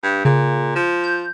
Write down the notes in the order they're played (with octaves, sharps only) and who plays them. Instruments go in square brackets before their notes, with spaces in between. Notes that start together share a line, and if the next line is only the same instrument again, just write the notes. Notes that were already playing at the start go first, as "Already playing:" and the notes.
[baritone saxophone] G2
[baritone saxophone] A#2 [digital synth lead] C#3
[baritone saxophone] F3
[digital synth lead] G6